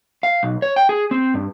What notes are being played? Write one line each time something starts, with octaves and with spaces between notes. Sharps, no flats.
F5
B1
C#5
G5
G#4
C4
G2